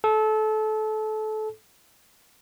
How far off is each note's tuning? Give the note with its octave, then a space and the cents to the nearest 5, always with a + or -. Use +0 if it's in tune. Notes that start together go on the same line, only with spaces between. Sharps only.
A4 -25